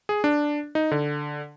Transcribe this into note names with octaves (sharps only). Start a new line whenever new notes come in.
G#4
D4
D#4
D3